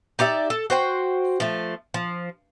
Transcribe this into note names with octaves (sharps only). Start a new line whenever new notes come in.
D#4 G4 D5 E5
A4
F#4 C5 G5
F3 A3
F3